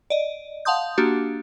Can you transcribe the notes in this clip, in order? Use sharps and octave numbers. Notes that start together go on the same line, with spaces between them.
D5 D#5
F5 F#5 A5 C6 D#6 G6
A#3 D4 F#4 G4